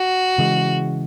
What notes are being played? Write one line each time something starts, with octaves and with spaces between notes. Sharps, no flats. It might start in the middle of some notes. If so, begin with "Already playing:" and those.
Already playing: F#4
C#3 E3 G#3